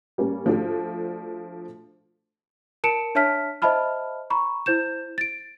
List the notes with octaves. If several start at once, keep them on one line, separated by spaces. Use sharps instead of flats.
G3 A#3 C#4
F3 A3 D4 F#4 A4
A#4 A5 C#7 D7 E7
D4 C#5 E5 A5 F6 B6
C5 D#5 E5 A5 B5 F6
A#5 B5 C#6
E4 C5 G6 E7
A6 D7